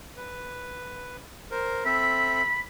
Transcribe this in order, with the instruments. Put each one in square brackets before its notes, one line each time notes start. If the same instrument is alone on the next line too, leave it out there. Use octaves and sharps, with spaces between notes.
[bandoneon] B4
A#4 C5
[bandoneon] C4 A4 E5 [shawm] B5